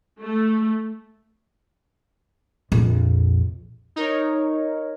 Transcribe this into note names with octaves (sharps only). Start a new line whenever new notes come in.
A3
A#1 F2
D#4 A#4 C#5